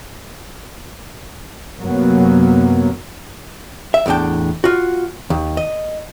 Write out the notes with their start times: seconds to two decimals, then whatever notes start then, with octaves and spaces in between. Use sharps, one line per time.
1.80 F#2 C3 F#3 A#3 B3
3.94 E5
4.06 E2 A2 F3 D4 G5
4.64 F4 F#4
5.30 D#2
5.57 D#5